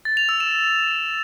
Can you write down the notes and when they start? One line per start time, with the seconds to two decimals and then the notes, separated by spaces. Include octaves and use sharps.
0.05 A6
0.17 F7
0.29 E6
0.40 E7